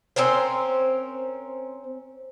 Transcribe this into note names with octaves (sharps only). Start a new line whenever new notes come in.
C4 C#4 A#4 C5